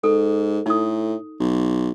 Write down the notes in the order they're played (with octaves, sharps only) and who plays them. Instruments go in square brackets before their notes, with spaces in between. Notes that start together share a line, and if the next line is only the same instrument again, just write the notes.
[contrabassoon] G#2 [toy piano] A4
[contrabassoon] A2 [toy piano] D#4 D#6
[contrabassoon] B1